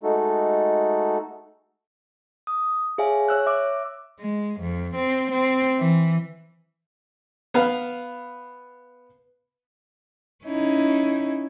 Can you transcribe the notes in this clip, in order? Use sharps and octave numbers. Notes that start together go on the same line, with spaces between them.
G#3 A3 D#4 F#4 A4
D#6
G#4 C#5 E5 F5 G#5
C#5 E6 F#6
E5 D6 E6
G#3
F2
C4
C4
E3
B3 B4 F5
C#4 D#4 E4